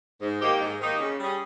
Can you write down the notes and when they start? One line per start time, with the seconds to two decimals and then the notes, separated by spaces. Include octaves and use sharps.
0.21 G#2
0.40 D#3 A#3 D#4 G4
0.61 G#2
0.79 D#3 A#3 D#4 G4
0.99 C#3
1.19 G3 C#4 G#4